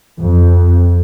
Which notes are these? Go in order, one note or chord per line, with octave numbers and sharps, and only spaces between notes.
F2